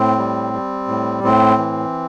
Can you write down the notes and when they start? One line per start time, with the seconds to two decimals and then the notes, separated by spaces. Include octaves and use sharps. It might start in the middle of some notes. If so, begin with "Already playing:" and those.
Already playing: A2 C4
0.18 G3
0.53 G3
0.88 A2
1.23 A2 C4
1.58 E3